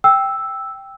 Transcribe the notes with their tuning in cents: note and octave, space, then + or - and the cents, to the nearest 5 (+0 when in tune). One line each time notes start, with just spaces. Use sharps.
G5 +0 E6 +0